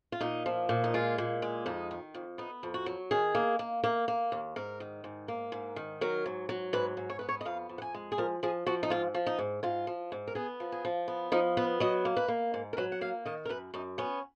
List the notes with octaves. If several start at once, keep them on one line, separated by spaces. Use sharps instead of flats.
F4
A#2 D#4
F3
A#2
D#4
G#3 F4
A#2
G#3
F2 D#4
D#3
F2
B3 D#4
F2
F#4
F#3
D#3 G#4
A#3
A#3
A#3
A#3
D#2
G#2 A#4
D#3
G#2
A#3
G#2
D#3
F#3 A#4
G#2
F#3
G#2 B4
G#2
C#5
B3 B4
C#5
D#5
F2 F5
F2
F#5
G#5
G#3
G#4
F3 A#4
F3 G#4
F3 F#4
D#4
G#2 F4
F3
D#4
G#2
G#2 F4
F3
G#2
A#4
B3 G#4
F3
G#4
F3
B3
F3 D#4
B3 B4
F#3 D#5
A#3
B4
A#3
G#2
A#4
F#3 B4
F#5
A#3 F5
D#3 D#5
A#4
F#2 B4
F#2 D#4
B3 C#4